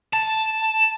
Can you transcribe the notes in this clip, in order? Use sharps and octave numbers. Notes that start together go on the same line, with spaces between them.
A5